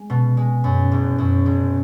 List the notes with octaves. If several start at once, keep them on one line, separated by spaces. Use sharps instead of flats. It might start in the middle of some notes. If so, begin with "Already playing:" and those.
Already playing: G#3
B2
G#3
F#2
F#1
F#2
F#1